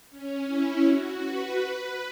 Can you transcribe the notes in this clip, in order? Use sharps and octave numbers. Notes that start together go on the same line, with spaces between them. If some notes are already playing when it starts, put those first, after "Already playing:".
C#4
E4
F#4
B4
B4